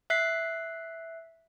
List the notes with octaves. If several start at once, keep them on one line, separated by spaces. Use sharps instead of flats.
E5 F#6 B6 C7